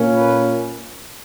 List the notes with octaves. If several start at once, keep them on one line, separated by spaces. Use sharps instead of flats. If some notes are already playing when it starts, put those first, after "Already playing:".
Already playing: A#2 A#3 C#4
B4